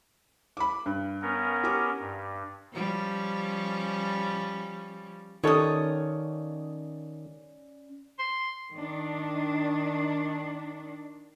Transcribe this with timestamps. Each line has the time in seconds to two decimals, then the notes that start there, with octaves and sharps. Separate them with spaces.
0.57 B5 D6
0.86 G2
1.22 B3 C#4 A#4
1.64 G4 D6
2.00 G2
2.73 F3 G3 C#4
5.44 D#3 C#4 F4 G4 A4 C#5 D5 D#6
8.19 C6
8.74 D#3 D4